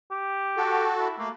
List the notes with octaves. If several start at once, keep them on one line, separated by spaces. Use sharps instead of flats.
G4
F#4 A4
E4
A3 A#3